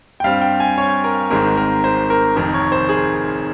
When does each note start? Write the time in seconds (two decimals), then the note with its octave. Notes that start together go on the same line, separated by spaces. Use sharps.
0.20 G5
0.24 G2 G3 C4 F5
0.41 G5
0.60 G#5
0.78 C#5
1.04 A#4
1.30 G#1 G#2 D#3 G#3 C4 A#4
1.57 A#4
1.84 C5
2.10 A#4
2.36 F1 F2 D#3 A#4
2.54 C#5
2.72 C5
2.89 G#4